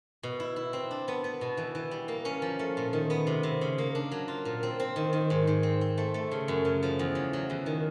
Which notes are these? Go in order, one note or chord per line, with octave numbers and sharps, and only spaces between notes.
B2
E4
E4
C4
D4
B3
B3
B2
E3
E3
G3
A#3
C#4
F3
A3
A#2
D#3
B3
C3
C3
C#3
A#3
D4
F#3
F4
A#2
C4
C4
D#3
D#3
G#2
G#2
C4
C4
A3
A3
C#3
F#2
C#3
F3
E2
F#3
F#3
E2
D#3